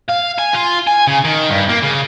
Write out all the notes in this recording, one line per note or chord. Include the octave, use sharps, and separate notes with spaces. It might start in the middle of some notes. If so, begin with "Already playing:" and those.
F5
G#5
F4
G#5
C#3
D#3
G2
A#3
C#3